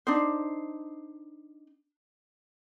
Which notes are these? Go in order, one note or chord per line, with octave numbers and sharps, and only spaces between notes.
D4 D#4 C5